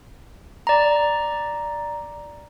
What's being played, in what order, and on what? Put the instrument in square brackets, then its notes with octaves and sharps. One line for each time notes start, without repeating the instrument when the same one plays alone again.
[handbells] D5 A#5